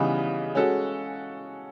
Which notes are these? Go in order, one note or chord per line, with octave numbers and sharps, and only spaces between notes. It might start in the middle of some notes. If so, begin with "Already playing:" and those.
Already playing: C#3 E3 G3 B3 D#4
G#3 C#4 F#4 A4